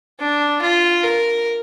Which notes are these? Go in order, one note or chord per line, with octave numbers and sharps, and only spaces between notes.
D4
F4
A#4